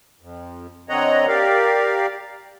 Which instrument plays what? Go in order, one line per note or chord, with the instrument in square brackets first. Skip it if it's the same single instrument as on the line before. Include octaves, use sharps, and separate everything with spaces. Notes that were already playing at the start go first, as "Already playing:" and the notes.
[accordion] F2
D3 C4 C#5 D#5 F#5 A#5
G4 A#4 D5 F5